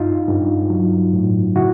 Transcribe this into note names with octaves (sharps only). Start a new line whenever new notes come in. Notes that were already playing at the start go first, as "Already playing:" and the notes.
Already playing: G2 D#4 F4
G2
F#3
A2
C#3 E4 F#4